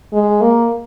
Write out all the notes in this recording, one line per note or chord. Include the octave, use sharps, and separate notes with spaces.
G#3
A#3